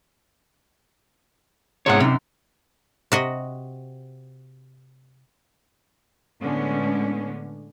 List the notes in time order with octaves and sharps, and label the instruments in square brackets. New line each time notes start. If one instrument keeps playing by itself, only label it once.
[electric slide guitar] G#2 G#4 C#5 [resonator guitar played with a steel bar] C3 D5 F#5
[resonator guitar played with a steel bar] F#2 D#4 [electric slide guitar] C3
[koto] C3 F#4 D#5
[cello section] A2 D3 G#3 B3 C#4